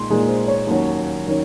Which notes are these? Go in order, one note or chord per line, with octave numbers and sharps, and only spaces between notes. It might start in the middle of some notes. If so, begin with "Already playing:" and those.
Already playing: A#2 G#3 D#4 C6
A#2 G#3 D#4
C5
C#5
D#2 D#3 F#3 C#4
D#3 F#3 C#4